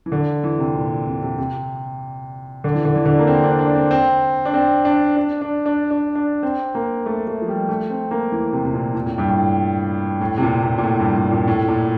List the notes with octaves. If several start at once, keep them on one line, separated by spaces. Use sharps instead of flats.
E3
D3
E3
C3
A#2
C3
C3
C3
D3
E3
D3
E3
D3
A#3
C4
D4
D4
C4
C4
D4
C4
D4
D4
D4
D4
D4
D4
C4
A#3
A3
A3
F3
G3
A3
C4
A#3
E3
C3
C3
A#2
A#2
A2
G2
A2
A2
C3
A#2
A#2
A#2
A2
G2
A2
A#2
A2
A#2